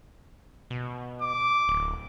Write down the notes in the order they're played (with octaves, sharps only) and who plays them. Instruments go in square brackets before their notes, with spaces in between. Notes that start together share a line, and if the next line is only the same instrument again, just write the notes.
[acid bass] B2
[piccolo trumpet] D6
[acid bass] D1